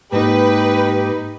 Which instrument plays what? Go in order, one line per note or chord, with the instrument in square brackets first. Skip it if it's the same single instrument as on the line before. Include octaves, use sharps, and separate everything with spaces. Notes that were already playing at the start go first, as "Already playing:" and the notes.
[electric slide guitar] G#2 A#3 [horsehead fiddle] D#4 [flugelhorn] G4 [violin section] B4